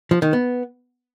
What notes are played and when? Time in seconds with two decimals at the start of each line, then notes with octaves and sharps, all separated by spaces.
0.11 F3
0.22 D#3
0.33 B3